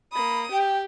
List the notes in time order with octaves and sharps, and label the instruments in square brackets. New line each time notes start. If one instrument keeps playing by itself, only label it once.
[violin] A#3 D#6 [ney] B5
[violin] G4 [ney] G5